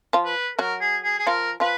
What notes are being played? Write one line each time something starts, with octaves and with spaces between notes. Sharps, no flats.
F3 F4
B4
F#3 F#4 A#4
G#4
G#4
G#4
F3 F4 A#4
F3 F4 B4